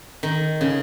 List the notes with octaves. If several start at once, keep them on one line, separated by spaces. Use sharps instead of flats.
D#3
C#3